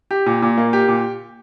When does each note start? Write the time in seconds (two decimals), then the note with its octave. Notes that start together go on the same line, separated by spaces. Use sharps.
0.11 G4
0.26 A#2
0.42 A#2
0.58 A#3
0.73 G4
0.88 A#2